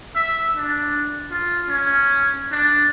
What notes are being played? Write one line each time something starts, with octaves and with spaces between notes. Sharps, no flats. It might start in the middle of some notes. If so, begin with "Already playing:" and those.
E5
D4
F4
C#4
D4